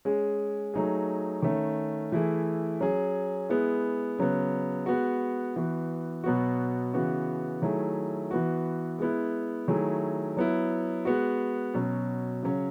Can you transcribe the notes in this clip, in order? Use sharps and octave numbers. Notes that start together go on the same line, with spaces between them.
G#3 C#4 G#4
F#3 A3 D#4 G#4
D#3 A3 C#4
E3 A3 E4 G#4
F#3 C#4 G#4
G#3 B3 E4 G#4
C#3 F#3 B3
G#3 B3 F#4
E3 B3 F#4
B2 F#3 B3 F#4
C#3 E3 B3 F#4
D#3 F#3 A3 E4 G#4
E3 B3 F#4
G#3 B3 E4
D#3 F#3 A3 E4 G#4
F#3 B3 E4
G#3 B3 F#4
B2 F#3 C#4
C#3 F#3 C#4